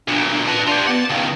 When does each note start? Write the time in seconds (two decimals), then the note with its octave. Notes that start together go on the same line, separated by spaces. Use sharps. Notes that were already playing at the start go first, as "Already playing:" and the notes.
0.08 B1 A#2 D4
0.31 D4
0.48 D4 B4 A5
0.67 F4 G4 D5
0.87 B3 F#5 A5
1.10 C#2 D#3 F5